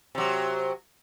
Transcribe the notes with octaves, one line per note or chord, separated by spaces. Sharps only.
C3 F#3